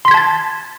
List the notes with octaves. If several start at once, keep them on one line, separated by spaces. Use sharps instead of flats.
A5 C6 G#6 A6 B6